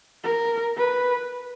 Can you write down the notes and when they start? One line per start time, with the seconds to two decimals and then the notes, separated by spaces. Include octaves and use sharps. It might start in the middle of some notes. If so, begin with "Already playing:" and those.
0.24 A#4
0.77 B4